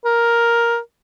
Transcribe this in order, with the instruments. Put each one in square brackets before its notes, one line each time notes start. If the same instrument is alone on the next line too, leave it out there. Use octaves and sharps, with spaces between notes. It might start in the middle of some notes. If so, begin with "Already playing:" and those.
[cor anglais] A#4